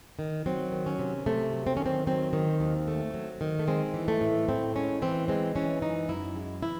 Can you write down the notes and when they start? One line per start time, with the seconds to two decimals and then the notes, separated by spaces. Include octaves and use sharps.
0.19 D#3
0.46 F#3 C4
0.72 D#3
0.86 C#4
0.99 C3
1.26 C3 A3
1.53 F#3
1.67 C4
1.77 D#3 C#4
1.86 C4
2.07 F#3 C4
2.33 D#3
2.60 D#2
2.88 A3
3.14 F#3
3.41 D#3
3.59 A3
3.68 G#3 C4
3.94 E3
4.08 A3
4.21 A2
4.49 A2 C4
4.75 G#3 C#4
5.02 E3 C4
5.28 G#3 C4
5.56 E3 C#4
5.82 F#2 D#4
6.09 F#2 E4
6.36 G#3
6.63 E3 E4